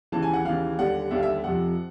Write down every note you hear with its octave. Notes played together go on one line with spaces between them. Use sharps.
D#2 C#3 E3 A5
G#5
F#5
D#2 C#3 E3 F5
D#2 D3 G3 F#5
D#2 D3 G3 E5
F5
E5
F2 C3 F3 F#5